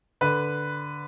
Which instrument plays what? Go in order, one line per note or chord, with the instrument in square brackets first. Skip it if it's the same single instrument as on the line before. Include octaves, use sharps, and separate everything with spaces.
[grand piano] D3 B4